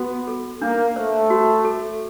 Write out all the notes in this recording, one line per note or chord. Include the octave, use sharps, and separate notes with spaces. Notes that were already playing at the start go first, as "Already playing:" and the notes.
Already playing: B3 F#4
A4
A#3 D4
A3 C5
F#4
A4